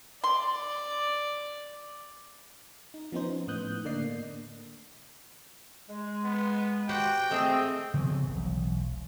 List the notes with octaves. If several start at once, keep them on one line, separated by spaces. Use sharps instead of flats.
D5 C6
D#4
F3 B3 C#4 D#4 C5
A2 B3 D#6 F#6 G6
A2 D3 A#3 D5 D#5 C7
G#3
B3
F#4 G4 C5 F#5 G5
A3 C4 G#4 D#5
C3 F3 B3 C4
E1 B1